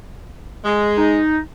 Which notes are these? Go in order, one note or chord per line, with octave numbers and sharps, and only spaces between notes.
G#3
D#4